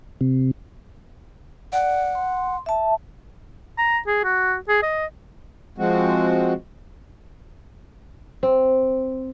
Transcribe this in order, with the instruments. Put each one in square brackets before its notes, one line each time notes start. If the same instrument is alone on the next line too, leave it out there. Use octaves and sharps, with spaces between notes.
[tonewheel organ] C3
[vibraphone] D5 [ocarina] F#5
[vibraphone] C6
E5 A5
[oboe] A#5
G#4
F#4
G#4
D#5
[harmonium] F3 G#3 C4 F#4
[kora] C4